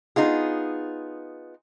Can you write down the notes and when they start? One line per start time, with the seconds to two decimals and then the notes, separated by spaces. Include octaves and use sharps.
0.16 B3 D#4 F4 G#4